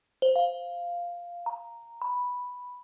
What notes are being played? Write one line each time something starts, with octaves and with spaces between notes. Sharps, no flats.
C5
F5
A#5
B5